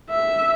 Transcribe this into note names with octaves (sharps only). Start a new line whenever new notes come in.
E5